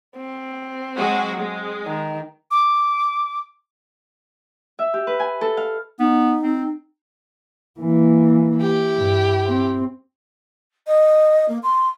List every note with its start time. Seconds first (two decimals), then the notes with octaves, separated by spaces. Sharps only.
0.17 C4
0.96 F#3 G#3 F#4
1.38 G#3
1.87 D#3
2.51 D6
4.79 E5
4.94 G4
5.07 B4
5.20 G#5
5.41 A4
5.57 F5
6.00 B3 D#4
6.43 C4
7.80 E3 A#3
8.60 E4 G4
8.95 G2
9.47 C4
10.87 D#5
11.49 A#3
11.63 C6